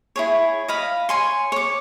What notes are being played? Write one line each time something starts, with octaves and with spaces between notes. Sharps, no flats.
E4 G#4 C#5
D#5 F5 B5
C#5 G#5 C6
C#5 D6